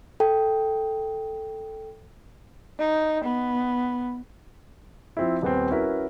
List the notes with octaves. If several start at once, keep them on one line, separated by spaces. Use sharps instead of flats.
A4 G5
D#4
B3
F3 C4 E4
D#1 B3 C4
C#4 E4 F#4 A#4 B4